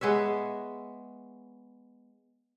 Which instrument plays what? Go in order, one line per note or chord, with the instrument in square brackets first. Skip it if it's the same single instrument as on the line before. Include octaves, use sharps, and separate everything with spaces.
[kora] G#3 B3 C#5 E5